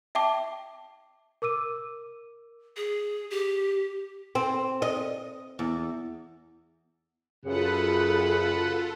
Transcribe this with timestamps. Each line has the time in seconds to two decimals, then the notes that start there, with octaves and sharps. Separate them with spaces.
0.15 E5 G5 A5 D6
1.42 A#4 D6 E6 D#7
2.76 G#4
3.30 G4
4.35 C4
4.82 D#5
5.59 E2
7.45 F#2 C#3 F4 A4 B4 F#5